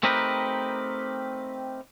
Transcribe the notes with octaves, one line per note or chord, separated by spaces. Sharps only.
A3 C4 D#4 G4 A#4 B4